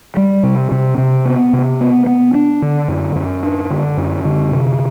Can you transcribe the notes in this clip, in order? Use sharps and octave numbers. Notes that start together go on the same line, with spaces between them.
G3
C3
C3
C3
B3
C3
B3
B3
D4
D3
F#2
F#2
D4
D3
F#2
D3
C3